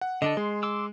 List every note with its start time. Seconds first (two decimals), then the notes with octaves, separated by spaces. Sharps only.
0.01 F#5
0.22 D3 D4 A4 D#5
0.37 G#3 C6
0.63 C6 D6 E6